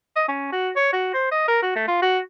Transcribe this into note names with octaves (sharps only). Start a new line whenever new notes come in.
D#5
C#4
F#4
C#5
F#4
C5
D#5
A#4
F#4
A3
F4
F#4